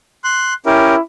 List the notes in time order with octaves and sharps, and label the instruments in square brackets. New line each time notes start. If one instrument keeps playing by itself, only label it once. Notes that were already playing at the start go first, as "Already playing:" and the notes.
[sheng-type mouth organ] C6 F#6
[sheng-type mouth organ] C#4 G4 A#4 [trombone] E4